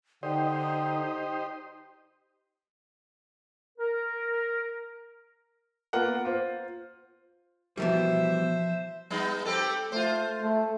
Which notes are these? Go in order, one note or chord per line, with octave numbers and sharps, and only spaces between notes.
D3 D#4 G4 C5 D5 D#5 G5
A#4
A#3 B3 F4 A#4 F#5
F4 C5
B2 E3 F3 G3 C5 E5
G3 B3 D#4
C4 G4 A4
A3 F4 C5
A3